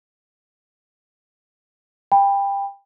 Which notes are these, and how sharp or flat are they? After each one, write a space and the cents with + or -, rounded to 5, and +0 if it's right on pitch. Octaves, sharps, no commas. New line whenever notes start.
G5 +25 B5 +0